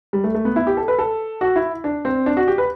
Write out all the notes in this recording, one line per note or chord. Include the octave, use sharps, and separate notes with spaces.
G3
A3
A3
B3
E4
G4
A4
B4
A4
F#4
E4
D4
C4
D4
F#4
G4
B4